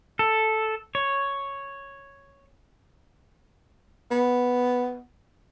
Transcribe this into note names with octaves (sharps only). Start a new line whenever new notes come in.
A4
C#5
B3